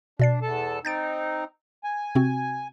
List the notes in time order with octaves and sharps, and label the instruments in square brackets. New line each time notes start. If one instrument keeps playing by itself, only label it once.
[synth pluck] B2 D5 C7 [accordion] D4
[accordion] E2 A4 A5
[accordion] C4 D#4 [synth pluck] G6 A6 D7
[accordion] G#5
[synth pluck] C3 C4 F#4